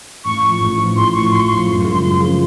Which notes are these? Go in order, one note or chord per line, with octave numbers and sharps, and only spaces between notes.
A1 C#6
A2 F3
A1
A2 F3
A1 C6
A2 F3 C#6
A1 C6
C#6
A2 F3 C6
F#2
C#3 F3 G#3
C6
F#2 C6
C#3 F3 G#3